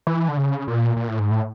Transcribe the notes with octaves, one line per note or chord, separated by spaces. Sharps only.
E3
D3
C#3
A#2
A#2
A2
G#2
A2